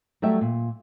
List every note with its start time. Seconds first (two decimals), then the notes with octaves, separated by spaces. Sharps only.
0.22 F#3 G3 A3 G4 E5
0.41 A#2